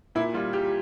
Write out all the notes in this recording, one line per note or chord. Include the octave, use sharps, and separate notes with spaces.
A#2 E4
G3 F4
G3 G4